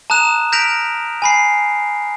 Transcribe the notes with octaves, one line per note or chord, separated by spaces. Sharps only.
A5 A#5 D#6 F#6 E7
F6 G6 A#6 B6 D7 F7
G#5 B5 C7